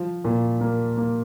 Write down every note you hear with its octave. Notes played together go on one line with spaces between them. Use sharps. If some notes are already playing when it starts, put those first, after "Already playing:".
Already playing: F3
A#2
A#3
A#3